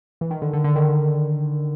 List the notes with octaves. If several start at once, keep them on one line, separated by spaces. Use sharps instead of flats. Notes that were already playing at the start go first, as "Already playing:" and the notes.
E3
D#3
D3
D3
D3
D#3